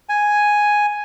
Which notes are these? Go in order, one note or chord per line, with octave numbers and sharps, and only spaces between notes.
G#5